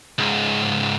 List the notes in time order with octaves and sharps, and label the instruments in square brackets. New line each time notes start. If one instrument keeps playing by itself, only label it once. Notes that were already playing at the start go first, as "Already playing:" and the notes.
[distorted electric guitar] C#2 G#2